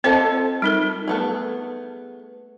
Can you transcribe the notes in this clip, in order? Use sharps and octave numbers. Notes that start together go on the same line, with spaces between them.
C4 F4 A4 C5 D#5 A5
G3 D#4 A#4
A3 B3 G#4